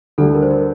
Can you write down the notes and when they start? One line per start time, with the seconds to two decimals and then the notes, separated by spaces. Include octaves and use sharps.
0.18 D2 D3 G3 A4
0.34 A#4
0.42 C5
0.51 A#4